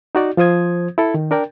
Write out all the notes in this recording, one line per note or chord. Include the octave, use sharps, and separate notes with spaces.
D#4 F#4 D5
F3 F4 C5 D#6 G#6
E4 A4
D#3
D4 A#4 D5 G5